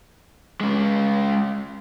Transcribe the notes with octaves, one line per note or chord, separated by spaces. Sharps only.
G#3 C#4